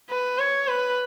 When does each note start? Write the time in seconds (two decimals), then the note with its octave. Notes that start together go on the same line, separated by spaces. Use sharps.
0.09 B4
0.38 C#5
0.68 B4